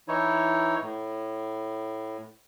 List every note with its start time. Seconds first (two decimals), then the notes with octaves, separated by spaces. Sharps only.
0.08 E3 D#4 E4 C#5
0.82 A2